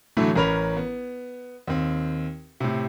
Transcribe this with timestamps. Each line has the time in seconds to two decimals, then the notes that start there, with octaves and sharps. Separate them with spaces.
0.17 A2 D3 E3 F#3 A3
0.36 A1 C#4 A#4 C#5 B5 F7
0.77 B3
1.68 D#2 C4
2.60 A2 C3